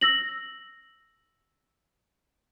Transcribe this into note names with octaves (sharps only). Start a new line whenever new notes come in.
E6 A#6 F#7